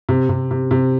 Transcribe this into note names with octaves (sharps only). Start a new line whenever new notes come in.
C3
C3
C3
C3